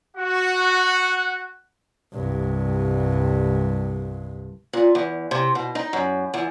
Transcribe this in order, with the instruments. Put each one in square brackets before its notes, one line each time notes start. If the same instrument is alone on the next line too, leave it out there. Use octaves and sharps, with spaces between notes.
[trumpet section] F#4 [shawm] F#5
[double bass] C2 G2
[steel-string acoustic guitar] A#2
E2
C3
B2
D#4
F#2
E2